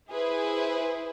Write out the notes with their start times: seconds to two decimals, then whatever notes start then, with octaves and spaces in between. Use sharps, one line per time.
0.11 E4 G#4 B4 C5